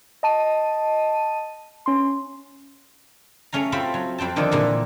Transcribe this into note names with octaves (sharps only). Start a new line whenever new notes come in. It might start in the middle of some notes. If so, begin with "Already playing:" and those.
D#5 A5 D#7
C#4 C6
A3 C#4 F5 A#5
C4 F4 F#4 A4 C5 B5
F#3
F2 C4 G5 A5
D3 D#3 F3 A4 D5
A#2 D3 E3 A#3 A#4